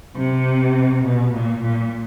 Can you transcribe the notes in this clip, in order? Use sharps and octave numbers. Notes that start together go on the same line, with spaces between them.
C3
B2
A#2
A#2